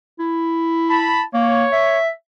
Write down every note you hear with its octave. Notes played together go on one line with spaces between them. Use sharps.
E4
A5 B5
A#3 C#5
E5